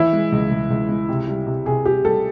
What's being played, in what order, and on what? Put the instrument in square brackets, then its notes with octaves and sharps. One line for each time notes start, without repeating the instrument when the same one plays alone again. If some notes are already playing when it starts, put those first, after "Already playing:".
Already playing: [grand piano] E3 [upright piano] E4
[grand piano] G#3
C#2
C#2
C#2
G#3
C3
G3
C3
[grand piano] C3 [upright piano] G#4
[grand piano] C3 [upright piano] G4
[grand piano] G3 [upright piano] A4